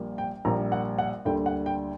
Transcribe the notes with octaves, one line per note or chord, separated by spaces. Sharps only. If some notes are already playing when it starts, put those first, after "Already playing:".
Already playing: A#1 A#2 G3 A#3
G5
A#1 A#2 G3 A#3 A#5
F#5
F#5
D2 D3 G3 A#3 G5
F#5
G5